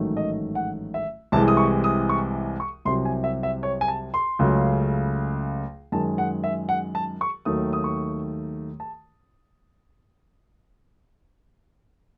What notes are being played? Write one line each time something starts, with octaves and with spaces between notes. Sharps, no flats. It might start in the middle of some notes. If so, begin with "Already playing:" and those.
Already playing: A1 G#2 D#3 F#3 A3
D#5
F#5
E5
C2 C3 E3 G#3 A5
D#6
C#6
D#6
C#6
C#6
C2 C3 F#3 C6
G#5
E5
E5
C#5
G#5
A5
C6
C#2 C#3 F#3 A3
F#2 D#3 G#3 A5
F#5
E5
F#5
A5
C#6
D#2 D#3 F#3 A3 D#6
D#6
C#6
A5